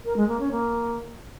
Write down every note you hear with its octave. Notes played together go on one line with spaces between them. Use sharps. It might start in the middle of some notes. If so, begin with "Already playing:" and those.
A#4
G#3
A#3
C#4
A#3